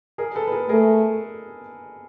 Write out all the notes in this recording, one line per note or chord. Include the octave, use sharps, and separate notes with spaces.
G#4 A#4
A4 B4
B4
G#4 A#4
A3 G#4 A#4